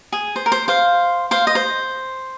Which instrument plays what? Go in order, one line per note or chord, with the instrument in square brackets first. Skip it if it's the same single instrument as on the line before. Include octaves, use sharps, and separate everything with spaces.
[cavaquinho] G#4
C5
A#4
C5
C5 F5
C5 F5
D#5
C5